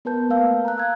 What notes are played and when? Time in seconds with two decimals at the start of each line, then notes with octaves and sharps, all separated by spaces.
0.05 B3 A#4 B4 A5 G6
0.29 A3 A#3 A#4 F5 E6
0.65 A#5 F#6
0.78 E6 G#6